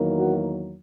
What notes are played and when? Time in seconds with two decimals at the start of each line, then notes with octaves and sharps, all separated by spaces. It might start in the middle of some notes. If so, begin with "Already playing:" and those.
Already playing: E2 D#3 F#3 A#3
0.18 F#4